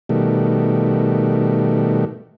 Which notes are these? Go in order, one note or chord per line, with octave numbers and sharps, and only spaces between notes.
B2 D#3 G3 A3